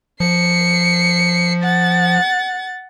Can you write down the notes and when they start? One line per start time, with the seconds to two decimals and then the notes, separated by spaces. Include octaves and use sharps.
0.20 F3 C7 C#7
1.63 F#5 A6